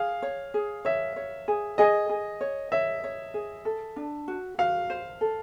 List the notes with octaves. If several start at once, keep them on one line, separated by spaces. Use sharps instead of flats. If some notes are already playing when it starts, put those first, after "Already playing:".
Already playing: G#4 F5
C#5
G#4
C#5 E5
C#5
G#4
G#4 D#5
G#4
C#5
C#5 E5
C#5
G#4
A4
D4
F#4
F#4 F5
C5
A4